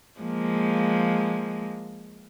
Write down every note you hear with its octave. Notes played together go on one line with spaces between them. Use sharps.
F3 G#3 A#3